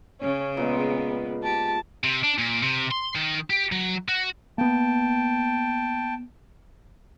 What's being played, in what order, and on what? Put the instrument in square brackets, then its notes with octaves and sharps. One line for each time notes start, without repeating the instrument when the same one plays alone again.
[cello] C#3 [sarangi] C#4
[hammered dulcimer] A#2 G#3 [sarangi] B3
[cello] G4 [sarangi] A5
[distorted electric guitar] C3
D4
A#2
C3
C6
D#3
G4
F#3
F#4
[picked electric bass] A#3 B3 [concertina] G5 A5